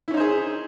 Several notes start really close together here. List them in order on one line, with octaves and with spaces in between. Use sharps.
E4 C#4 D#4 C5 G#4